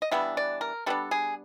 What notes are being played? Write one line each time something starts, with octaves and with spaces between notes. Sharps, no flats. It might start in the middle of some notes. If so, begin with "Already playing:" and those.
D#5
E3 G3 B3 D4 E5
D5
A#4
E3 G3 B3 D4 A4
G#4